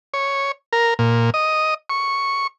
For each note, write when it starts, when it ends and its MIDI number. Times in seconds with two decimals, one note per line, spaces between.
0.14 0.52 73
0.73 0.94 70
0.99 1.30 46
1.34 1.74 75
1.90 2.47 85